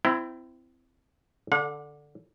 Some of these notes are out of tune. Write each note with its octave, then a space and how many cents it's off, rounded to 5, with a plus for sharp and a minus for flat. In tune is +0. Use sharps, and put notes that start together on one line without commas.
C4 -15 E4 +15 A#5 +0
D3 +0 F#5 -45